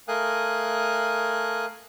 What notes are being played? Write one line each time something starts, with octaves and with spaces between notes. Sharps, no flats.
A3 A#4 F5 G#5 D#6 F#6